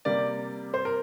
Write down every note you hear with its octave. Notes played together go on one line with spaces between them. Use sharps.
C3 G3 A#3 D5
C5
A#4